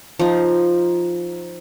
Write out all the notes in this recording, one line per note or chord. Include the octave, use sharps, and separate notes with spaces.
F3 D#4